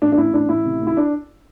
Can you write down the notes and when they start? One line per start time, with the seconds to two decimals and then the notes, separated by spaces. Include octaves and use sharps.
0.02 A1 D4
0.12 D4
0.17 A1 E4
0.34 A1 D4
0.49 A1 E4
0.65 C3
0.81 D2
0.87 E4
0.97 D4